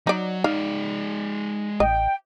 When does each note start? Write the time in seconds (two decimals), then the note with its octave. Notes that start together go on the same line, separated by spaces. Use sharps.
0.07 F#3 D#4 D5
0.44 G#3 D#4 D5 F5
1.80 A1 D#5 G5